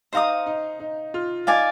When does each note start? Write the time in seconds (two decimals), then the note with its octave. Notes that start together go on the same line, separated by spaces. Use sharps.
0.13 D#4 C5 F5 A#5 D#6
0.47 D#4
0.80 D#4
1.14 F4
1.47 D#4 D5 F5 G#5